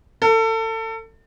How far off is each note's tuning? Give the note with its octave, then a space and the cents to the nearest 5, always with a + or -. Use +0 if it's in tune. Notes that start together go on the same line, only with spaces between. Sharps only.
A4 +30